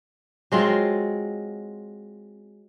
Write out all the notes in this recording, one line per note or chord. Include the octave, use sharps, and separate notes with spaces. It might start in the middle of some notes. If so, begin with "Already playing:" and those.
F#3 G#3 C4 F4